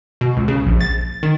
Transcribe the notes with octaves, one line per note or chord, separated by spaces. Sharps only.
B2
C#2
C#3
A#1
A6
D#3